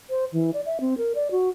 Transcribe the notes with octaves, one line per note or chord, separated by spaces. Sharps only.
C5
E3
D5
E5
C4
A#4
D5
F#4